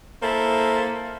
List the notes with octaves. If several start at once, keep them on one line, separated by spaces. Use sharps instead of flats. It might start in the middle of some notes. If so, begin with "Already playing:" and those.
A#3 E4 A4 C5